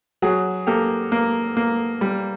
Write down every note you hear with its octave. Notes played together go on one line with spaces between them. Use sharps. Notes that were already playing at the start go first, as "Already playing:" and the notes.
F#3 F#4 G#4
A#3 G4 A4
A#3
A#3
G3